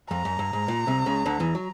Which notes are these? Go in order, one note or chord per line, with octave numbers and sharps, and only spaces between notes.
F2 A#5
F#2
G2
G#2
A#2
C2 C3
C#2 C#3
D2 D3
E2 E3
F#3